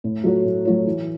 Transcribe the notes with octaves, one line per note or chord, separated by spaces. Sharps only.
A2
F#3 A3 F#4 C#5
A2
F#3 A3 F#4 C#5
E3